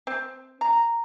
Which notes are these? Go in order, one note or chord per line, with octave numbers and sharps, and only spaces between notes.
C4
A#5